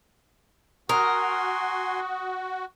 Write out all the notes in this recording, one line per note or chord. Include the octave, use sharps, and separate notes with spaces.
F#4 A#4 G#5 C6 D#6